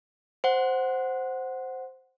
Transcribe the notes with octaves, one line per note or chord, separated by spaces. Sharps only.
C5 F#5